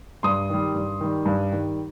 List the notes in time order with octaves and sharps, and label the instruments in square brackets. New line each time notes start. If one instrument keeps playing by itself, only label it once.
[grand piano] G2 C6 D#6
D#3 G3
G2
D#3 G3
G2
D#3 G3